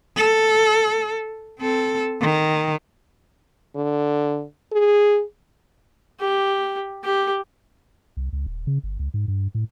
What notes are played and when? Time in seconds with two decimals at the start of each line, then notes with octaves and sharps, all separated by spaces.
0.17 A4
1.60 C4 A4
2.21 D#3
3.76 D3
4.73 G#4
6.20 G4
7.04 G4
8.17 C2
8.33 C#2
8.46 D#1
8.67 C#3
8.83 G1
8.99 C#2
9.14 G#2
9.28 G2
9.55 A2